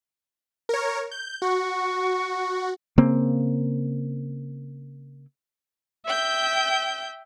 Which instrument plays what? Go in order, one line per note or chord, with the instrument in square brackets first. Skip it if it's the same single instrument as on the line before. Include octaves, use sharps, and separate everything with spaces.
[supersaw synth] A#4 C#5
G6
[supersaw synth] F#4 [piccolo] C#6
[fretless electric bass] C#3 A#3 C4
[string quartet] E5 G5 G6